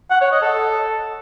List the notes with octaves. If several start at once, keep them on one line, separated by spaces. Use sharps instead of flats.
F#5
C#5
D#5
A4